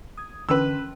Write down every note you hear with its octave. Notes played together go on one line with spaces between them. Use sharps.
D#6 G#6
D3 E3 C#4 B4 E6